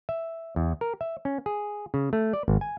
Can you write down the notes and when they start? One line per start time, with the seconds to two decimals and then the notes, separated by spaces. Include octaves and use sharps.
0.09 E5
0.56 E2
0.81 A#4
1.01 E5
1.25 C#4
1.46 G#4
1.94 C#3
2.13 A3
2.33 D5
2.48 G#1
2.61 G#5